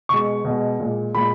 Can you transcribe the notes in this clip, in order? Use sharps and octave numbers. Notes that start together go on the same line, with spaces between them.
B2 G#3 C#6
B2 G#3
A#2 G#3
A#2 G#3 B5